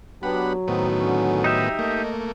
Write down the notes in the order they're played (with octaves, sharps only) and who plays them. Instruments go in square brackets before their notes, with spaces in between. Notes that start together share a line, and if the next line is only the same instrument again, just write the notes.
[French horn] F#3 [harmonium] B3 D4 G4 [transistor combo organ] F#5 B5
[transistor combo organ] A2 D#3 B3 [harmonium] C4 D#4 F#4
[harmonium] D3 C#4
[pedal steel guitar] D#4 G4 E5 [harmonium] D#5
[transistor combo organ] A3 A#3